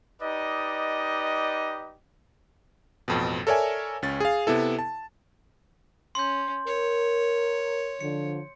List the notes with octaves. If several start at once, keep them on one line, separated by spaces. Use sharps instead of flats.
D#4 G4 B4 D5 D#5
A1 F2 B2
A4 A#4 C#5 D5 E5 G#5
C#2 C#4 A6
G#4 F5
C3 B3 E4 A4
A5
C#4 C6 G6
A#4 C#5
D3 F3 C#7